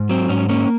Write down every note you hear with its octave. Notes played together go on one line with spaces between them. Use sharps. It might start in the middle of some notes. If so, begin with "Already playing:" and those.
Already playing: G#2
F#3 C4
G#2 C#4
A#3 C#4